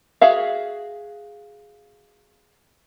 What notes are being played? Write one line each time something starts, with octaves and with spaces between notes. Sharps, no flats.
F#4 G#4 E5 F5